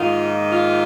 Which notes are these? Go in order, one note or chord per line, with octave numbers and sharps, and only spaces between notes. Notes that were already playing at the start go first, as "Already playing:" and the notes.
Already playing: G#2 D#3 A#3 F4
F4